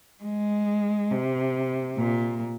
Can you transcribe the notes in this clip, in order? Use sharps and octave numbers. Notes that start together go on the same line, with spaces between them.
G#3
C3
A#2